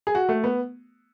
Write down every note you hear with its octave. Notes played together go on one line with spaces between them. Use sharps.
G#4
F#4
A3
B3